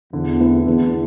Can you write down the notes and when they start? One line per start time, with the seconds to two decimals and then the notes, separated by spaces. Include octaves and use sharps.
0.13 E2 D3
0.39 A3 C4 E4 B4
0.66 E2 D3